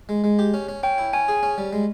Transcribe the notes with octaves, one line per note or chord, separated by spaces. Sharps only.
G#3
G#3
G4
C#4
C#4
C#4 G5
E4
C#4 G#5
G#4
C#4
G3
G#3